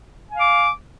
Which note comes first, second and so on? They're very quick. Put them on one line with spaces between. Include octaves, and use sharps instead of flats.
G#5 F5 D6